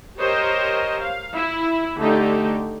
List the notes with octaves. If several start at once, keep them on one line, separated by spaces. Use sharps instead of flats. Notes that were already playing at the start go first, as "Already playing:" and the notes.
G4 A#4 C5 C#5 D#5
F5
E4
D3 A3 D#4 G4